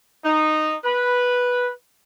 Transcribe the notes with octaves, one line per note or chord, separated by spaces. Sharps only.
D#4
B4